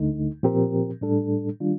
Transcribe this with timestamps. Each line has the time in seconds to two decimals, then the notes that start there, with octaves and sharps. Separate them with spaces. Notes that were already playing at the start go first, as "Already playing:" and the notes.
Already playing: D2 D3 A3 D#4
0.43 A#2 F3 C4 G4 A#4
1.01 A2 G3 D4 A4
1.60 D#3 G3 D4 F4